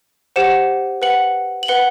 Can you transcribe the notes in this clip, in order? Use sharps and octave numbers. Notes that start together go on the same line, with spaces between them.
G4 C5 F#5 E7
B4 F#5 F#7
F#7
B4 F#5 G7